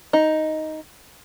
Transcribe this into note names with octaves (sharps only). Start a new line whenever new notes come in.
D#4